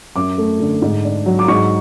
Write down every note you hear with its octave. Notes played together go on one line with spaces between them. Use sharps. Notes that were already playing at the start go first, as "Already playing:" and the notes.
F#2 D6
A3
D3
G#2
D4
F#3
D6
G#2 C#6